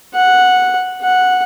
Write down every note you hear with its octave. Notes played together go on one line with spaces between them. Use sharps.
F#5
F#5